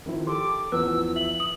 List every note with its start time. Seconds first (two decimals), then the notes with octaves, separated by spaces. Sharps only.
0.06 D#3 F3 E4
0.27 G4 A4 C6 D6
0.72 A1 E2 F3 B4 E6
1.16 E5 F#7
1.40 D#6